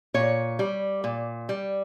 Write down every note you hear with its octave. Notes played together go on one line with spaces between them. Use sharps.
A#2 C#5
G3
A#2
G3